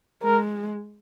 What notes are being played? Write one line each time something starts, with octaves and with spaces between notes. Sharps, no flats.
G#3 A#4